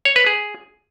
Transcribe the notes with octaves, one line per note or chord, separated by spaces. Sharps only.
C#5
B4
G#4